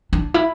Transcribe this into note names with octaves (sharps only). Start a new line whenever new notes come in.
D4
E4